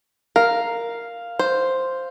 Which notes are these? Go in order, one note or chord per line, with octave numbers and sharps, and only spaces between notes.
A#4 F5
C5